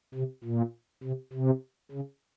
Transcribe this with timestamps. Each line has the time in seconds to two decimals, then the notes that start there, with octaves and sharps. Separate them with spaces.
0.14 C3
0.44 A#2
1.03 C3
1.33 C3
1.91 C#3